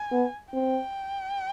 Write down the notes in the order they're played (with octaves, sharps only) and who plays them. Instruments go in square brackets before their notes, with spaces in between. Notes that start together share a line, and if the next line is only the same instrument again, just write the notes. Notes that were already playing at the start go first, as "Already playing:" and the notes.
Already playing: [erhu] G#5
[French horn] B3
[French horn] C4 [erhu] G5